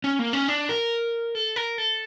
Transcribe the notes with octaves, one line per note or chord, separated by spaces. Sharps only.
C#4
A#3
C#4
D4
A#4
A4
A#4
A4